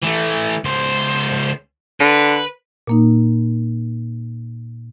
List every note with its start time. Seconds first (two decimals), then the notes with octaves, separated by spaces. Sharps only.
0.02 E3 A3
0.64 C#2 C5
2.00 D3 B4
2.87 A#2 A#3 D#4